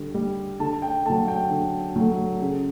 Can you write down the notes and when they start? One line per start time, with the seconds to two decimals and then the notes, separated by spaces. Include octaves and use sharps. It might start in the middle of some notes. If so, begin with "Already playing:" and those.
Already playing: D3 G3
0.14 G3
0.60 D3 A5
0.82 G5
1.05 A3 A5
1.10 F#3
1.28 G5
1.50 D3
1.96 F#3 A3
2.42 C#3